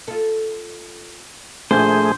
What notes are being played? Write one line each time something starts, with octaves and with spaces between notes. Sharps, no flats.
F4 A4
A#1 D#3 A3 G#4 C5 G6